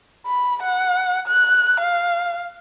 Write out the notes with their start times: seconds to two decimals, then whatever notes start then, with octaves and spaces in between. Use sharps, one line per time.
0.26 B5
0.62 F#5
1.27 F#6
1.80 F5